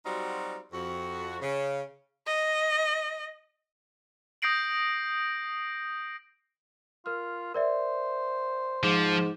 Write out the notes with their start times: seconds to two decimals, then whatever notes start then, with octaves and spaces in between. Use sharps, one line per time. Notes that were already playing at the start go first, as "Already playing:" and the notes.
0.05 F#3 G3 C4 D#4 F4 F#4
0.72 F2 F#4
1.41 C#3
2.27 D#5
4.42 D#6 G6 A#6 C7 D7 F#7
7.06 F4 A#4 F6
7.54 A#4 C5 D5 E5
8.83 G#2 F3 D6 D7